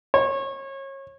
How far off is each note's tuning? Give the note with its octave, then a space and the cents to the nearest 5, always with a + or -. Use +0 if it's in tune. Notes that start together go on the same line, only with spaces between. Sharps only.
C#5 -30